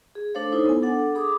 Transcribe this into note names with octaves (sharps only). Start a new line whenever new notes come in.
G#4
A3 D4 A4 C5 C#5 F5
D#4 E4 A4 C5 C#5
B3 G#5
D4 A4 F#5
G#4 B5 D6 D#6